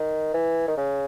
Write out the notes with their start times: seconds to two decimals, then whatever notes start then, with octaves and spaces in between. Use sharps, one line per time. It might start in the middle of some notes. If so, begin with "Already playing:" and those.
Already playing: D#3
0.34 E3
0.68 D#3
0.77 C#3